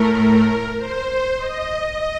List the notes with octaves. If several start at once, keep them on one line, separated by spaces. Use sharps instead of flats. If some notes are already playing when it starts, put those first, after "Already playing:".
Already playing: A2 A3 A#4
C5
C5
D#5